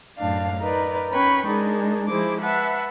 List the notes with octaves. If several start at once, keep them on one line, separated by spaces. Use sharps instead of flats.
F#2 A2 D4 F5
D#4 A#4 B4 D5
C#4 B4 G5 B5 C#6
G#3 D4 D#4 G#4 A#4
F3 G#3 E4 G#4 C5 D6
B4 E5 F#5 A5